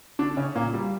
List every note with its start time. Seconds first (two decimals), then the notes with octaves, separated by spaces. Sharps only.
0.19 D3 D4
0.37 C#3 C#4
0.55 A#2 A#3
0.73 G3